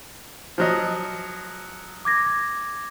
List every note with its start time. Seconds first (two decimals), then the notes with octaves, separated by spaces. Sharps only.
0.58 F3 F#3 D#5
2.05 D6 G#6 A#6